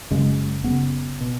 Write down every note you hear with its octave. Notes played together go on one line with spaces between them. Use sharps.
F#1 F#2 C#3 G#3
F#1 F#2 C#3 B3
B2